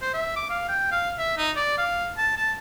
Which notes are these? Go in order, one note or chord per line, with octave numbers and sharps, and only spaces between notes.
C5
E5
D6
F5
G5
F5
E5
D#4
D5
F5
A5
A5